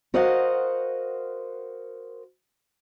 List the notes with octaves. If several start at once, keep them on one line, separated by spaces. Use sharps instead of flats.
F#4 A#4 C5 D#5 F5 F#5